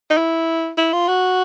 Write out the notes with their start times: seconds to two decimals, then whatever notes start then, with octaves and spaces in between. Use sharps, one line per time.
0.10 D#4
0.17 E4
0.77 E4
0.93 F4
1.08 F#4